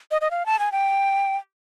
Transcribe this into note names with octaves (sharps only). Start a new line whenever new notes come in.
D#5
D#5
F5
A5
G#5
G5